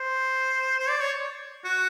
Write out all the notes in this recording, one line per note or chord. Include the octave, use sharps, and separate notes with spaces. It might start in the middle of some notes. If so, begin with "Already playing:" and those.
Already playing: C5
C5
D5
C#5
F#4